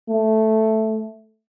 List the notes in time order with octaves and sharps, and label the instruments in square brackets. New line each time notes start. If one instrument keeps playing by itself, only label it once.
[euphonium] A3